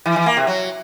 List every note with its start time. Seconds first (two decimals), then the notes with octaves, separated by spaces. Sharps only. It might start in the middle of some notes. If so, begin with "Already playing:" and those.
0.06 E3
0.16 E3
0.26 A#3
0.37 C3
0.47 F#3